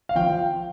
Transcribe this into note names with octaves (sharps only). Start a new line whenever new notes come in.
F5
F3 G5